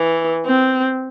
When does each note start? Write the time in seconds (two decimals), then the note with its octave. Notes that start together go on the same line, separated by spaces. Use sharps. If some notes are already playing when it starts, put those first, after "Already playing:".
Already playing: E3
0.46 C4